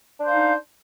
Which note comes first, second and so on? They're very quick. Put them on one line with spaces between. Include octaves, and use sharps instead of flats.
D4 C5 F5 D#4